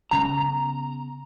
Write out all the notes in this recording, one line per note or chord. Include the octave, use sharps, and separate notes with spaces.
C#3 B3 A#5